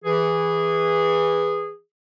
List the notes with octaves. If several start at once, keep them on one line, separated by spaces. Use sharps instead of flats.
E3 G#4